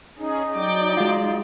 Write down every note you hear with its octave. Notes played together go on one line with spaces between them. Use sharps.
C#4 D#4 G#4
F#3 D5 G5 D6
G#3 F4 F#4